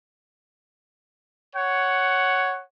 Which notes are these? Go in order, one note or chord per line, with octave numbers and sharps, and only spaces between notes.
C#5 F#5